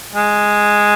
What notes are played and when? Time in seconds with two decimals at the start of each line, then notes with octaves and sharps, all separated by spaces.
0.15 G#3